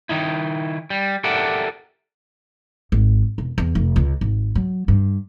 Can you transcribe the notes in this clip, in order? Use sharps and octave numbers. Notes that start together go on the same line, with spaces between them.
D#3 D#4 E4
G3
G4 A4 A#4 D5 E5 F#5
G#1
E1
E2
F1
C#2
G#1
F#3
G2